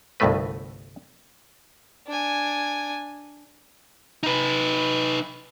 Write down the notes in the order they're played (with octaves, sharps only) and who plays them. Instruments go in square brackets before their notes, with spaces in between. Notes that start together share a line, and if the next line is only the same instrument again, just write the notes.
[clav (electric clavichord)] G1 C2 G2 B2 A3 B4
[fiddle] D4 G#5
[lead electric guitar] D#4 B4